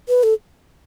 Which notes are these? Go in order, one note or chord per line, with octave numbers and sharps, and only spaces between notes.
B4
A4